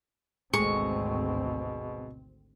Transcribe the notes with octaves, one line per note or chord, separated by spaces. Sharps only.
G#1 D2 B2 G#3 A3 C4 G#4 C#6